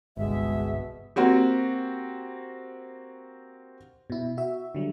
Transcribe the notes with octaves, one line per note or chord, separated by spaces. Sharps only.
G1 C2 B2 G#3 E5
A#3 C4 F#4 G4
B2 E4
F#4 E5
D3 F#3 G3